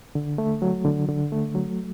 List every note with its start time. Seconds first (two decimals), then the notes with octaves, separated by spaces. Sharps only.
0.15 D3
0.38 A3
0.62 F#3
0.85 D3
1.08 D3
1.32 A3
1.55 F#3